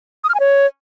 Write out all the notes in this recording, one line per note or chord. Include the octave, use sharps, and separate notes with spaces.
D#6
F6
G#5
C#5